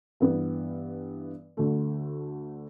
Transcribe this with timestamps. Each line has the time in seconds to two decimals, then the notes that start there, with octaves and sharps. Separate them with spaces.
0.20 G2 E3 B3
1.57 D2 D3 A3